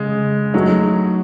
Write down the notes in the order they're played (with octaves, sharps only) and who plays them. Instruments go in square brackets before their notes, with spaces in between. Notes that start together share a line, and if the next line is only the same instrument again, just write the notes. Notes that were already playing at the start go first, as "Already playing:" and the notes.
Already playing: [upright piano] C#3 [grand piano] G#3
[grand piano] F#3 [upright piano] A3 D#4 G#4